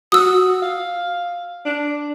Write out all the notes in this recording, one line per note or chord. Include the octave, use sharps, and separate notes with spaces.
F#4 D#6 E6
F5
D4